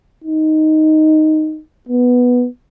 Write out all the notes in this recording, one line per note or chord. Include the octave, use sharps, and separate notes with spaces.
D#4
B3